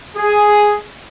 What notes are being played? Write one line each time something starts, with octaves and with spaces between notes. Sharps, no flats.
G#4